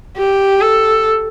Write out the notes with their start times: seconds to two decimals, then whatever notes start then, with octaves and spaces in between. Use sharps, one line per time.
0.18 G4
0.61 A4